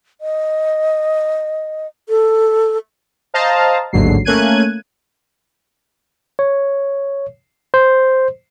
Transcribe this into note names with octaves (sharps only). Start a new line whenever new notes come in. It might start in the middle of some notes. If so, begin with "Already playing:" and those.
D#5
A4
C5 D#5 F5 A5 A#5
A1 D#2 G#2 D3 F#3 C7
A3 A#3 C#4 F#6 G#6 D#7
C#5
C5